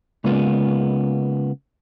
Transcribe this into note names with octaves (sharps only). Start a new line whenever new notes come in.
C#3 G#3 A#3 B3 F4